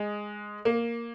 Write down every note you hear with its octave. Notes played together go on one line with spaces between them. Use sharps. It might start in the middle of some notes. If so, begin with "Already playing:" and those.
Already playing: G#3
A#3